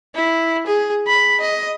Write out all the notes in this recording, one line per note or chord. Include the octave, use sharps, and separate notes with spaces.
E4
G#4
B5
D#5